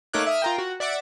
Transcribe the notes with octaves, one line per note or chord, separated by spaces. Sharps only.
A3 A#3 D#4 C#5 D6 F#6
E5 D#6 F6
F4 A#4 G5
F#4
D5 E5 F#5 D6